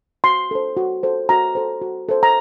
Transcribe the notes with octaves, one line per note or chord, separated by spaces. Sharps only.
F#4 C6
A4 C5
F#4
A4 C5
F#4 A#5
A4 C5
F#4
A4 C5
A#5